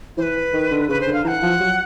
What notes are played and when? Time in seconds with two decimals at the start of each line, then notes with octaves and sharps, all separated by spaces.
0.17 E3 B4 C5
0.53 D#3
0.71 D3
0.89 C#3 B4
1.01 C5
1.07 D3
1.13 F5
1.24 E3 F#5 A#5
1.42 F3
1.61 F#3